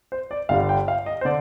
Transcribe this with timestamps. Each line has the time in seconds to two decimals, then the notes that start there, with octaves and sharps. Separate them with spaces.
0.12 C5
0.31 D5
0.49 G1 G2 D3 G3 F5
0.69 G5
0.88 F5
1.06 D#5
1.21 C5
1.25 D3 D5